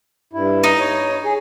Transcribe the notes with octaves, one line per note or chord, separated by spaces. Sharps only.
G2 E4
D#4
C#5
G#4